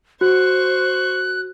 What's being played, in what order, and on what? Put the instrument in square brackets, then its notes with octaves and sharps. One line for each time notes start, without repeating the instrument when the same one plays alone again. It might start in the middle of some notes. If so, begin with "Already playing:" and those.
[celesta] F#4 [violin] C5 C#6 [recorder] F#6